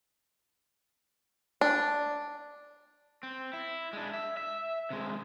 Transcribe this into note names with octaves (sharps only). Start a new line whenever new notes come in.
D4
C4
E4
G#3 D4
E5
E5
C3 G#3